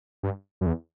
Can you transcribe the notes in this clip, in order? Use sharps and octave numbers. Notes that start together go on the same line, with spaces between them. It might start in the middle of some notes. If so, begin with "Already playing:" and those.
G2
F#2
E2